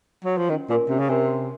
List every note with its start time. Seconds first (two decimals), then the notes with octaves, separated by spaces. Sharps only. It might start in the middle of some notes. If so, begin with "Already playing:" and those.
0.25 F#3
0.38 F3
0.49 D#3 C#4
0.69 A#2 F#4 A#4 C#5 G#5
0.89 C3 C#4
0.99 C#3
1.08 C3 F#4 A#4 C#5 G#5
1.28 F#4